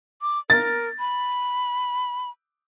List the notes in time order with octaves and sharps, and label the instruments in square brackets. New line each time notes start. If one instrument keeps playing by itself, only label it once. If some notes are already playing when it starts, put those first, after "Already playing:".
[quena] D6
[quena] A#4 [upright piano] A6
[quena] B5